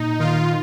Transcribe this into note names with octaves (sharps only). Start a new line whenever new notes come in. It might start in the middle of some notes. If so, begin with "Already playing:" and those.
Already playing: A#2 D#4
D#3 F4